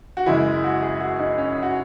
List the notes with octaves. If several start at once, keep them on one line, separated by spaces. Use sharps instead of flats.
F#4
F#2 C#3 E3 G#3 E4
F#4
G#4
F#4
D#4
C#4
F#4